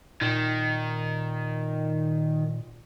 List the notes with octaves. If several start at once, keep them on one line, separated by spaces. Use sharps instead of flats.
A#2 D#3